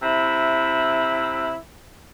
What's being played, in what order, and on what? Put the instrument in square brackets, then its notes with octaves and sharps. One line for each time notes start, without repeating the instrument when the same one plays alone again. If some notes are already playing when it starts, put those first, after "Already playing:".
[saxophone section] C3 E4